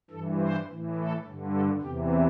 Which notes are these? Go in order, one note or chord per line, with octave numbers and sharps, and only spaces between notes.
G2 E3 A4
C5
A2 E3
A4
G2 D3
A4
E2 C3 E3 G4